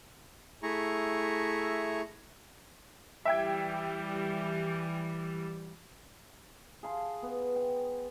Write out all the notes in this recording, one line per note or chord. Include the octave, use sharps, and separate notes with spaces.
A3 E4 G#4 A#5 C#6
E3 G3 E5 G5 G#6
G#4 F5 A5 C6
B3
G5